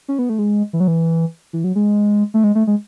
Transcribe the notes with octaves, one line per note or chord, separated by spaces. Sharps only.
C#4
B3
A3
G#3
E3
F#3
E3
E3
F#3
G#3
A3
G#3
A3
G#3